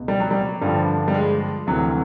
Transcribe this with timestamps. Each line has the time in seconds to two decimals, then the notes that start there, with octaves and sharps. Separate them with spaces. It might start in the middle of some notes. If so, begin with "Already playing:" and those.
Already playing: C#2 B2
0.08 G3
0.20 F#3
0.31 G3
0.61 G2 D3 F3 G3
1.08 G3
1.14 G#3
1.67 D2 C3 E3 F#3